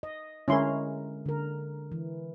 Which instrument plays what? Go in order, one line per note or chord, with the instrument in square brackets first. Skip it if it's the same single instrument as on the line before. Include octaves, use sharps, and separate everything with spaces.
[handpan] D#5
[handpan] D3 G#3 A#4 [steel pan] C#4 E4 C6
[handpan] D3 A#4
E3